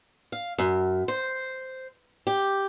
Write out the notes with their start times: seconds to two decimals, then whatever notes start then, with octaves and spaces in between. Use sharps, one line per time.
0.32 F5
0.58 F#2
1.08 C5
2.27 G4